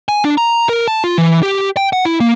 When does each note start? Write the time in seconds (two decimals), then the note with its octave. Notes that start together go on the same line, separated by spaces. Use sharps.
0.09 G#5
0.25 D4
0.38 A#5
0.69 A#4
0.88 A5
1.04 F4
1.18 E3
1.43 G4
1.77 G5
1.93 F#5
2.05 E4
2.20 A#3